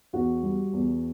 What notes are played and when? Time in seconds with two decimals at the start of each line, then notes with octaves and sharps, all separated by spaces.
0.13 E2 F#4
0.43 G3
0.73 E2